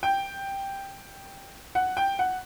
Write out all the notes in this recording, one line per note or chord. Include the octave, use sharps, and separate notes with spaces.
G5
F#5
G5
F#5